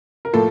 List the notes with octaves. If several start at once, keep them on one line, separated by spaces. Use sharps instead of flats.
A#4
A2 F3 A#3 A4